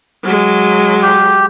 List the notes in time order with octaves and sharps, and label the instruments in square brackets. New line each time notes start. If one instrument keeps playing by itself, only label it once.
[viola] F#3 G#3
[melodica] G4